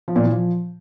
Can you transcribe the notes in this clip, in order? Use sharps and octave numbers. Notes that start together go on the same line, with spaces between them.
F3
A#2
E3
F3